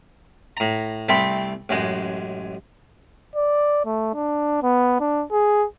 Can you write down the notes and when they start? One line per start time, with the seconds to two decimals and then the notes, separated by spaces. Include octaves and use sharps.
0.57 A2 A#5
1.09 C2 A3 C4 A4 B5
1.69 A1 F#2 G#3
3.36 D5
3.85 A3
4.14 D4
4.63 B3
5.00 D4
5.32 G#4